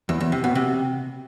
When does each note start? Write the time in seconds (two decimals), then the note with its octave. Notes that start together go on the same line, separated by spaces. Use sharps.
0.09 E2
0.21 E2
0.32 C3
0.44 B2
0.55 C3